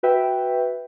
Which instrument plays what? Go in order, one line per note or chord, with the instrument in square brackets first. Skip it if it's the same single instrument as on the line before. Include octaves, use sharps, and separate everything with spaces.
[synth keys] F#4 B4 E5 G5